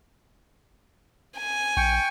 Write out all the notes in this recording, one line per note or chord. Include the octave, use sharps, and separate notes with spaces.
G#5
A#1 G5 C#6